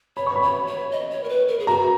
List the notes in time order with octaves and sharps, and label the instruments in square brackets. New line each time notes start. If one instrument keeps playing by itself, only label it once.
[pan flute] C#5 [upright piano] B5
[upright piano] C#6
B5
[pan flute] C#5
C#5
D#5
C#5
A#4
B4
A#4
G#4
[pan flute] F#4 [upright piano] A#5